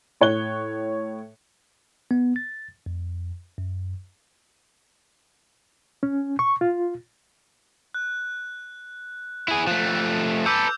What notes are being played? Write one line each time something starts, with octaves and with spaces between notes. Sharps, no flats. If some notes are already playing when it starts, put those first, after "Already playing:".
A2 C#5 F#6 G7
B3
A6
F2
F#2
C#4
C#6
F4
F#6
E4 G#4
F3 A3 F#6 E7
A4 B4 D6 E6 G6